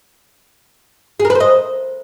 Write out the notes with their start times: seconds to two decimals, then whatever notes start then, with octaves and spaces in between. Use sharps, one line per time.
1.19 G#4
1.25 A#4
1.30 B4
1.35 C5
1.40 D#5